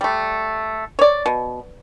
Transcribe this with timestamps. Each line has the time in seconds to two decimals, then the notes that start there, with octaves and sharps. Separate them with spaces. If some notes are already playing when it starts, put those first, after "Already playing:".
0.01 G3 A3
0.99 C#5 D5
1.26 B2